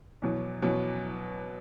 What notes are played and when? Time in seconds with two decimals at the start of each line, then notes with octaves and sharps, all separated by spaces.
0.22 E2 B2 F#3
0.62 E2 B2 F#3